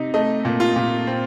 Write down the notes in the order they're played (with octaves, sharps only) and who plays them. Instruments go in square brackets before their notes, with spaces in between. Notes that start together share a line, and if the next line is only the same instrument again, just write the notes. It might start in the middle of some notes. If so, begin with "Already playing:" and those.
Already playing: [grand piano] C3 D#4
A3 D#5
A#2
F4
A#2
C4